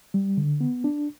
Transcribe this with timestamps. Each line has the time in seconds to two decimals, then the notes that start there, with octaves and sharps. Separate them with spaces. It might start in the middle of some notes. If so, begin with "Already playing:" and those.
0.14 G3
0.37 D3
0.61 B3
0.84 D4